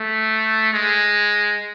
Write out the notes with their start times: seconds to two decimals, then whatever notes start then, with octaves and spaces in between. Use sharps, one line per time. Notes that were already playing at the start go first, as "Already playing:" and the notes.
Already playing: A3
0.73 G#3